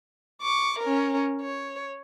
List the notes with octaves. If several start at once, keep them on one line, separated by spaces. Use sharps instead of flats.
C#6 D6
C#4 A#4
C#5